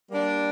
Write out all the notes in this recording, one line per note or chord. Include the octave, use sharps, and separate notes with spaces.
G3 A#3 D4